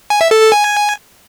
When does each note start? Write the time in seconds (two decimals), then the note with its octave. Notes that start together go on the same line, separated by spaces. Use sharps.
0.10 G#5
0.21 E5
0.31 A4
0.42 A4
0.52 G#5